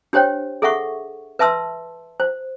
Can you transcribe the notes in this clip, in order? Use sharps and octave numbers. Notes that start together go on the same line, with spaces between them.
D4 G4 C5 C#5 G5
G#4 A4 E5 F#5 C#6
B4 E5 A5 C6 E6
C5